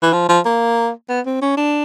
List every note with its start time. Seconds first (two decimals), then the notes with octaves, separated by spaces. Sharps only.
0.03 E3
0.13 F3
0.29 F3
0.46 A#3
1.09 B3
1.26 C4
1.42 C#4
1.57 D4